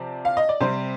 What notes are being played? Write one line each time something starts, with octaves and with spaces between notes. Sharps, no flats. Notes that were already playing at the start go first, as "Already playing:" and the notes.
Already playing: C3 F3 C4 D5
F5
D#5
D5
C3 G3 C4 C5